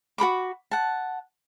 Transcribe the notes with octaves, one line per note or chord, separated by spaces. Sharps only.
F#4 A#4 B5 D6
F#5 A5